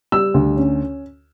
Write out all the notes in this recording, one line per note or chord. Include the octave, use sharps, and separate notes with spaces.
G3 E6
D2
C#4